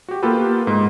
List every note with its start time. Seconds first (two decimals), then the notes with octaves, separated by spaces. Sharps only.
0.08 F#4 G4
0.23 A#3 B3 F4 G4 A4 B4
0.67 G#2